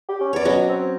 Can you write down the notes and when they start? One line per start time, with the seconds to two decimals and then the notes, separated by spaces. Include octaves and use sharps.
0.09 G4
0.21 C#4
0.33 E2 C#5 D5
0.45 B2 F#3 C#4 F#4
0.69 C4